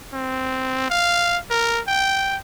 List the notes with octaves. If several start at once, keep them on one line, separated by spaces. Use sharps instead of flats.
C4
F5
A#4
G5